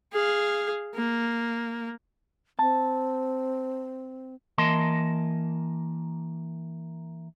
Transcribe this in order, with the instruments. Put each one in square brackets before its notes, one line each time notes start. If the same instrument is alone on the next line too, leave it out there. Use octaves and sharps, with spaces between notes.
[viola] G#4 F5
A#3
[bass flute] C4 [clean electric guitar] A5
[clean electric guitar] E3 A#3 A#4 D#5 A5 C6